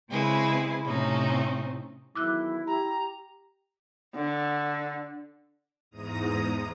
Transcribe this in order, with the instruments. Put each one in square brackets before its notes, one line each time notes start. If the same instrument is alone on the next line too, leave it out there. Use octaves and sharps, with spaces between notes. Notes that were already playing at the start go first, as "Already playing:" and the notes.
[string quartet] C#3 G#3 C4 E4 G#4 B4
A2 C3 A3 C4 C#4 D#4
[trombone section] E2 D#3 F#3 [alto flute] E4 [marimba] D6 E6 F#6
[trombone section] G4 [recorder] A#5
[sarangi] D3
[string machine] E2 G#2 A#5 D#6